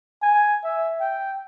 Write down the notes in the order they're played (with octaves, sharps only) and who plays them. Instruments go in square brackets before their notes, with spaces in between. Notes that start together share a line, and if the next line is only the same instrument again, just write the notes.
[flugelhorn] G#5
E5
G5